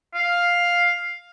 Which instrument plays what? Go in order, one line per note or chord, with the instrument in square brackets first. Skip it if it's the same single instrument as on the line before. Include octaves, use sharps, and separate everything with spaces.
[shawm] F5